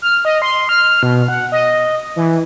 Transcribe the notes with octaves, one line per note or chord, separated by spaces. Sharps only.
F6
D#5
C6
F6
B2
F#5
D#5
E3